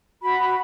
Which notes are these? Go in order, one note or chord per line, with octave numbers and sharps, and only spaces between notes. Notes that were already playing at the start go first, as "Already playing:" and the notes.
F#4 B5
B5